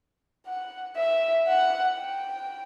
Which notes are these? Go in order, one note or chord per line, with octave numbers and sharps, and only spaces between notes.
F#5
E5
F#5
G5